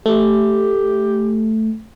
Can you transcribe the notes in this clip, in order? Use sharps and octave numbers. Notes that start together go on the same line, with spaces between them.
A3 G4